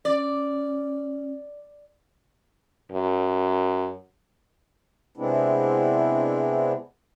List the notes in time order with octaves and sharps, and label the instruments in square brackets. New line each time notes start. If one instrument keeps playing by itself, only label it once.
[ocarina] C#4 [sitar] D5
[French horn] F#2
[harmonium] C3 G#3 B3 C4 D4 E4